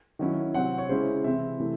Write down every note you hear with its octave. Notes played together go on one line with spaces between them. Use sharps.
D#3 F#3 C#4 E4
C3 F#3 C4 F#5
C#5
C#3 G#3 C#4 E4 C5
C3 E3 C4 E4 E5
C3 E3 A3